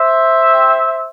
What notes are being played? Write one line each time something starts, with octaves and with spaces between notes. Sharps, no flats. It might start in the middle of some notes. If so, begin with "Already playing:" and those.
Already playing: C5 E5
C4 G4